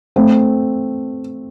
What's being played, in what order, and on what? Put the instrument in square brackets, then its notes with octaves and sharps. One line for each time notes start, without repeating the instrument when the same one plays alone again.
[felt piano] A3 C4